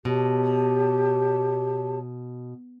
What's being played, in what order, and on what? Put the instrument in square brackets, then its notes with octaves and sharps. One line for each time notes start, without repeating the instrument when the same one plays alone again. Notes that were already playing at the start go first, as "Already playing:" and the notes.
[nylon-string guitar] B2 [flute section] G4 C#5 A5